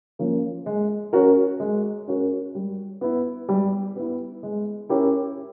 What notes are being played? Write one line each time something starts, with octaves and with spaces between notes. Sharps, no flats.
F3 A#3 C#4 F4
G#3
C#4 F#4 A#4
G#3
C#4 F#4 A#4
G3
B3 E4
G3
B3 E4
G#3
C#4 E4 G4 A#4